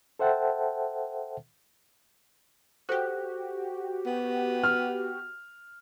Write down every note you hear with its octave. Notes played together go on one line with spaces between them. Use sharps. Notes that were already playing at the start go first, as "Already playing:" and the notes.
A4 C5 E5 F#5 G5 A5
F#4 G4 A4 C5 F#6
B3
F6